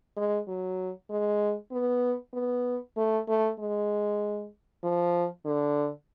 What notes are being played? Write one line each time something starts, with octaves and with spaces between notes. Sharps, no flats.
G#3
F#3
G#3
B3
B3
A3
A3
G#3
F3
D3